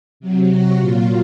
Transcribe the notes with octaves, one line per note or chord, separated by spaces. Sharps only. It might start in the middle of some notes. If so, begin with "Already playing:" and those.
C3 F#3
F#4
A#2 F#3 F4